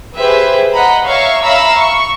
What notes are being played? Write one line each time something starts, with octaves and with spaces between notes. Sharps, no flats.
G4 G#4 B4 C5 E5
D#5 F#5 A#5 B5
C#5 E5 F5 A#5 C#6
E5 F5 A#5 B5 E6
C#6